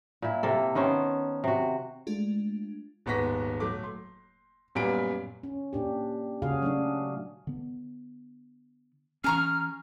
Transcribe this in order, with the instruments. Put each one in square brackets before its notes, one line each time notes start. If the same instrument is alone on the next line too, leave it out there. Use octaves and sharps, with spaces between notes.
[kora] A#2 E4
C3 A#3 A4
D#3 B3 C#4 C5
C3 F#4
[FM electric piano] G#3 A3 D4 F4
[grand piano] D#1 G#2 B3 C#6 A#6 B6
F#3 A3 D6
C6
F#2 A#2 G3 B3 A#5 D7
[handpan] C#4
A#2 D4 G4
C#3 C#4 F#4 G#4 F5
F#3 A3 D4
[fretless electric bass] D3 B3
[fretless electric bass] E3 C#4 [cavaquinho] G#4 A#5 C#6 [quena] F6